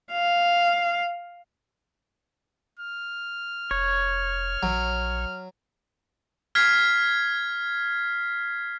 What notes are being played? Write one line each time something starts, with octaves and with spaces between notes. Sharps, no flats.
F5
F6
F1 C#5
A#1 F#3
F6 G#6 B6 C7